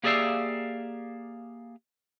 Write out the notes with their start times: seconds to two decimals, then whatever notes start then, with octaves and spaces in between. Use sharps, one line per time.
0.04 A#3 G4 G#4 D5 E5 F5